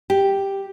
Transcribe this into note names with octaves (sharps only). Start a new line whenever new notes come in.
G4